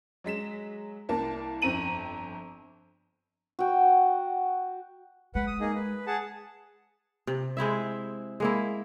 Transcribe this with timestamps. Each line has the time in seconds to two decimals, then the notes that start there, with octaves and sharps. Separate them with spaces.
0.24 F#3 G#3 B6 E7
1.09 C2 A#3 A5
1.62 G1 F2 C4 A#5 D#7 F#7
3.59 F#4 G5
5.35 G#3 B4 F#5
5.47 D#6
5.60 A#3 D#4 G#4
5.75 B4
6.07 G#4 F#5 A5
7.27 C3
7.57 G#3 C4 E4 E5
8.40 G#3 A#3 E4